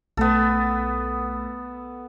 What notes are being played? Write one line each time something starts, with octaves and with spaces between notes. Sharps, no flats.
B1 A3 B3 A4